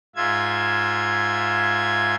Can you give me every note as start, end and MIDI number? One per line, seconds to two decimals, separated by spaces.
0.16 2.15 44
0.16 2.15 65
0.16 2.15 76
0.16 2.15 92